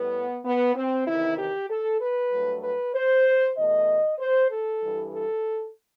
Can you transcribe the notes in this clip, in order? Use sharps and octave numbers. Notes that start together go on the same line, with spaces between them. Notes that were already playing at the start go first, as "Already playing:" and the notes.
Already playing: A2 G3 B3
B3
C4
E2 C3 D#3 E4
G4
A4
B4
G2 F#3 A3
B4
C5
E2 B2 A3 D#5
C5
A4
G2 E3 G3
A4